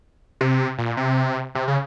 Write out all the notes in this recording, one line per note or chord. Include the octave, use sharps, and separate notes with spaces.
C3
A#2
C3
C3
C#3